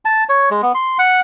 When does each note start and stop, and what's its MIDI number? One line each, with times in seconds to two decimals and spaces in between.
0.05 0.24 81
0.29 0.49 73
0.51 0.61 56
0.62 0.72 59
0.75 0.98 84
0.99 1.21 78